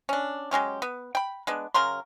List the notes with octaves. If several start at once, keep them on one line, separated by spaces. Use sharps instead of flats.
C#4 D4
F#3 G#3 C#4 G4
B3
G5 B5
G#3 B3 D4
C#3 F#3 A#4 C6